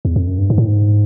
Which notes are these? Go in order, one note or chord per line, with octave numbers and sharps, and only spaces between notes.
E2
F2
F#2
G2
G#2
A2
G#2